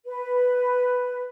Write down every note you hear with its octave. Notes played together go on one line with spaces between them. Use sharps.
B4